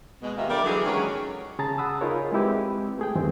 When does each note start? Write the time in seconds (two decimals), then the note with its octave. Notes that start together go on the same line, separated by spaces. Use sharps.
0.22 B2 G#3
0.37 D#2 D#3 A#3 F4 D#5 E5
0.50 D3 G3 A#4 D5
0.65 D3 E3 F#3 G4 G#4
0.85 D#3 F#3 G#3 C#4
1.59 C#3 G#4 A5 A#5 A6
1.78 F#5 B5 D#6 E6
2.01 D#4 F4 G#4 A#4 C#5
2.32 G#3 C4 E4 G4 B4
2.99 A3 G#4 G5
3.16 E2 G2 D#3 E3 C4